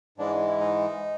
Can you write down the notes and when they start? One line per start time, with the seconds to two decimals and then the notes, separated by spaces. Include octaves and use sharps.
0.18 G#2 E3 G#3 D4
0.47 E4
0.60 D#4